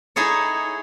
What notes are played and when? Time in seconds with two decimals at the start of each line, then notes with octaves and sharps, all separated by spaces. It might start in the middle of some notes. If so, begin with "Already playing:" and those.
0.16 D#4 E4 G#4 A4 C#5